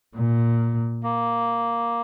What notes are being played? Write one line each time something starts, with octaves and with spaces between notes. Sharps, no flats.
A#2
A#3